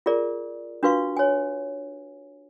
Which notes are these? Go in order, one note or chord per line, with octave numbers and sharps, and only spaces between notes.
F4 G#4 A#4 D5
D4 F4 F#4 B4 F5 C#6
C#5 G#5